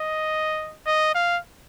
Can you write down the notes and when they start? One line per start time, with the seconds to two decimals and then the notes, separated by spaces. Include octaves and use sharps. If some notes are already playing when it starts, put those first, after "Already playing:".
Already playing: D#5
0.86 D#5
1.15 F5